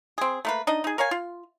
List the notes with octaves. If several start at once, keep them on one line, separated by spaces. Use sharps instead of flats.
C4 G#4
A3 A#3 B4
D4 D#4 D#5
D#4 G#4
A#4 C#5 F5 G#5
F4